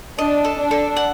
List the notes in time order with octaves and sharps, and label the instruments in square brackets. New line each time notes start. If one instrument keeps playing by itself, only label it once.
[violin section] D4 [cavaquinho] D#5
[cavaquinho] A4
[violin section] D4
[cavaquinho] A4
F#5